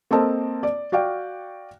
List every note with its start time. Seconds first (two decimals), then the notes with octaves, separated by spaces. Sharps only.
0.11 A#3 C4 A4 C5 D#5 A5
0.63 D5
0.92 F#4 D5 F5 G5